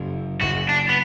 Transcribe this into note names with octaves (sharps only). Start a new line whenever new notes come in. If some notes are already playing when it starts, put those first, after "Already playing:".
Already playing: F#1 F#2 C#3
F#1 F#2 C#3 F#4
D4
B3